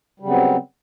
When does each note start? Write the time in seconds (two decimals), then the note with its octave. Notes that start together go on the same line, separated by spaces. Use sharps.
0.20 G3
0.22 C#3
0.25 F#3
0.28 B3
0.30 C4